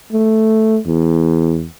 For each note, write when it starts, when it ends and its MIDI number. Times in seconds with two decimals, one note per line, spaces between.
0.13 0.79 57
0.86 1.67 40